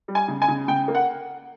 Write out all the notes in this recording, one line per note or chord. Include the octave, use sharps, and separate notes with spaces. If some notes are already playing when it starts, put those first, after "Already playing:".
G3
G#5
C#3
G#5
C#3
C#3 G5
A#3
F#5